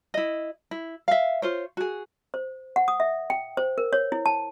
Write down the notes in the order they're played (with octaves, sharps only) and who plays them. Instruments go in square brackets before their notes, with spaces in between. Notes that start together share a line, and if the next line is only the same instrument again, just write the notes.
[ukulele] E4 D#5
E4
E5 F5
F4 C5 C#5
F#4 G#4
[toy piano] C5
F#5
D#6
E5
G5
C5
A#4
C#5
E4
A5